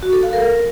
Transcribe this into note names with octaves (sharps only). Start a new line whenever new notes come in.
F#4
A4
F5
A#4